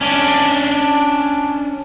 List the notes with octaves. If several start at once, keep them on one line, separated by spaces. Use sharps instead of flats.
C#4 D4